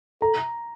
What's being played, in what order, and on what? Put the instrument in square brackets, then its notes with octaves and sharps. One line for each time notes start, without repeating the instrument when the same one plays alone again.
[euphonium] A4 [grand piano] A#5